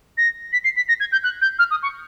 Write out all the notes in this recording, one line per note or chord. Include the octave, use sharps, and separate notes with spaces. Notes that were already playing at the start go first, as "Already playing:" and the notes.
A#6
B6
C7
B6
A#6
G#6
G6
F#6
G6
F6
D#6
C#6